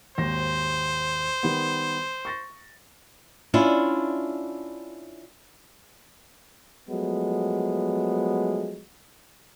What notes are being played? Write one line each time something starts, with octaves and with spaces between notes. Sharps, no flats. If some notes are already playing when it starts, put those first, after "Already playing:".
G#1 D#2 C5 A#6
D#3 G3 B3
C#6 A6 A#6
C#4 D4 E4 F4
F3 F#3 G#3 A3 B3